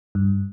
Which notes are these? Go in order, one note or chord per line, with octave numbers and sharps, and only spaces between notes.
G2